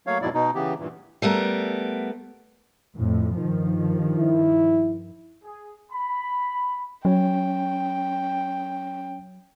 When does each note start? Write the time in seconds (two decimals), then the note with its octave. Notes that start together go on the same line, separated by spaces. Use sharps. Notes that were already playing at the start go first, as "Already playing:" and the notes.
0.07 F#3 A3 A#3 C#5 F5
0.22 F2 G#2 B2 F#3 E4 D5
0.34 B2 D#4
0.55 C#3 E3 B3 G4
0.79 G2 A#2 E3
1.22 G3 A3 B3 A#4
2.97 F2 A2
3.39 G2 D#3 F3
4.19 E4
5.44 G#4
5.92 B5
7.05 F#3 C#4 C#5 G5